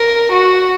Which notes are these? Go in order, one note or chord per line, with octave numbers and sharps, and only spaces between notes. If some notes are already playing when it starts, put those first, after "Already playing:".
Already playing: A#4
F#4